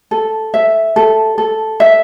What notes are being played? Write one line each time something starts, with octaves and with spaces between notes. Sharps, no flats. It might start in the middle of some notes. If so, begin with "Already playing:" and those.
A4
E5
A4
A4
E5